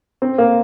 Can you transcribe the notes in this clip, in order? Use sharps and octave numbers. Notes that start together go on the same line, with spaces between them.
C4
A#3